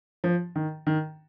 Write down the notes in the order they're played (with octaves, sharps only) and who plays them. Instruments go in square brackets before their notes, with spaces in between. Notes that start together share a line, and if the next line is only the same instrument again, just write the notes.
[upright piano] F3
D#3
D#3